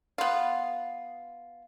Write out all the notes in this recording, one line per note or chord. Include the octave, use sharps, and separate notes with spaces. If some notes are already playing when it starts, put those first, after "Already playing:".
B3 F4